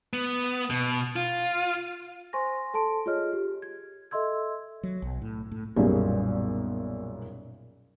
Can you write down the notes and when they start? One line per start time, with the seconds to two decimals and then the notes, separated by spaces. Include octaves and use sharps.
0.13 B3
0.70 B2
1.16 F4
2.33 C5 G#5 C6 C#6 A#6
2.74 A4 A5 C6 D7
3.06 F4 G#4 C#5 D#5 F6
3.33 G4
3.62 G#6
4.11 A4 D#5 E5 C6 E6 G#6
4.83 F#3
5.02 B1
5.22 A2
5.52 A2
5.76 B1 F#2 A#2 G3 G#4